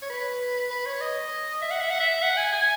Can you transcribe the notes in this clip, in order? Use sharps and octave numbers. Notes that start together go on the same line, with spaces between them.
C#5
B4
B4
C#5
D#5
E5
F#5
E5
F#5
E5
F#5
G#5
G#5